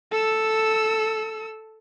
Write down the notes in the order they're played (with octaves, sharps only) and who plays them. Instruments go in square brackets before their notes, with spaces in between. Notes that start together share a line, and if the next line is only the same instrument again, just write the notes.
[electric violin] A4 E6